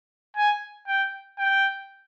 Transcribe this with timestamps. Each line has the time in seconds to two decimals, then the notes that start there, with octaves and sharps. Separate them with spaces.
0.37 G#5
0.87 G5
1.38 G5